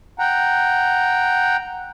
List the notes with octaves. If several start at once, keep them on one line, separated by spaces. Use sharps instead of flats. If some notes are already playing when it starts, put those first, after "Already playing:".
F#5 G5 A#5